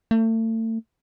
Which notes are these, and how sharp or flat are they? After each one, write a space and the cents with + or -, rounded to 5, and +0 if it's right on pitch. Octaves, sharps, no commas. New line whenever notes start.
A3 +35